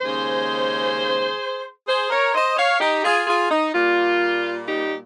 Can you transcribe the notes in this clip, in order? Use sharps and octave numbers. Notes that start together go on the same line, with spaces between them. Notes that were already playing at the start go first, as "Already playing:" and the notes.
D#2 C#3 G#3 C#4 G#4 C5
G#4 C5
A#4 C#5
C5 D#5
C#5 F5
D#4 G4
F4 G#4
F4 G#4
D#4
A#2 G3 A#3 F4
D#4 G4